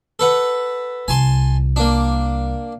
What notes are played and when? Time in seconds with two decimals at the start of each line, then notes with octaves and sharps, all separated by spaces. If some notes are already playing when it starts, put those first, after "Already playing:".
0.19 A4 B4 F#5
1.08 C2 G#5 A5 C6
1.76 A#3 D4